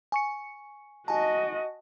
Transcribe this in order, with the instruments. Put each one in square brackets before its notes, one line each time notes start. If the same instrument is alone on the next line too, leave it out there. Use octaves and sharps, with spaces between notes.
[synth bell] G#5 C#6 C#7
[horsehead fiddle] F#4 D#5 [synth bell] G#5 A5